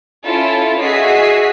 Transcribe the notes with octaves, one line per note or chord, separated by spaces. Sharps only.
C#4 E4 F4 A4
F#4 G#4 D#5 E5 B6 C7